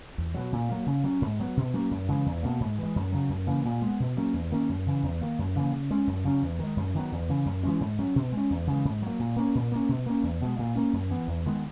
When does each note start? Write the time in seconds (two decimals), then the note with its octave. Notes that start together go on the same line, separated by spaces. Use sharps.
0.18 E2
0.34 B2 F#3
0.53 A#2
0.69 F#3 A#3
0.86 C#3
1.04 F#3 C#4
1.22 G#2
1.40 F#3 B3
1.57 B2
1.74 F#3 A#3 C#4
1.91 F#2
2.08 C#3 E3 G#3
2.26 E2
2.43 B2 A#3
2.60 G#2
2.78 E3 G#3
2.96 F#2
3.12 C#3 F#3
3.29 F#2
3.47 C#3 E3 A#3
3.65 A#2
3.82 G#3 B3
4.00 B2
4.17 F#3 A#3 C#4
4.34 E2
4.51 D#3 A#3 C#4
4.69 F#2
4.87 C#3 E3
5.03 E2
5.21 D#3 A#3
5.39 F#2
5.56 C#3 E3 A#3
5.72 C#3
5.91 G#3 C#4
6.07 F#2
6.24 C#3 F#3 C#4
6.42 E2
6.59 D#3 G#3
6.77 F#2
6.94 D#3 F#3 B3
7.12 E2
7.29 C#3 E3
7.46 F#2
7.63 E3 G#3 C#4
7.81 G#2
7.99 F#3 C#4
8.16 B2
8.32 G#3 C#4
8.50 E2
8.67 C#3 E3 G#3
8.85 G#2
9.02 F#3 A#3
9.19 A#2
9.36 A#3 C#4
9.55 A#2
9.72 A#3 C#4
9.89 B2
10.06 A#3 C#4
10.23 E2
10.41 B2 G#3
10.59 A#2
10.75 A#3 C#4
10.93 F#2
11.10 E3 B3
11.27 E2
11.46 D#3 G#3 B3